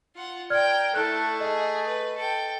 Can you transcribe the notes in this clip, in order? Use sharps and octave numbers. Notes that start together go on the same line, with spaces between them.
F4 F#5
A#4 D5 G5 F6 G#6
A3 E4 A4 F#6
G#4 D#5
B4
A4 G5